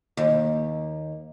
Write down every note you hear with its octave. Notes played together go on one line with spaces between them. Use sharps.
D#2